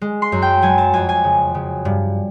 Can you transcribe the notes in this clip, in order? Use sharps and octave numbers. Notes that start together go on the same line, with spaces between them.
G#3
C6
F#2
G5
F#3 G#5
A5
F2 G#5
G#5
C#3
C#3
G2